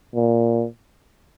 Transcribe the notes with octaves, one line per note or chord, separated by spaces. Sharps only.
A#2